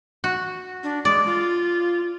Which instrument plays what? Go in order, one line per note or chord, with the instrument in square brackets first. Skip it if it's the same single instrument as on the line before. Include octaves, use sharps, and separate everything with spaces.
[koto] F#4
[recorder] D4
[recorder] G#3 [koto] D5
[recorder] F4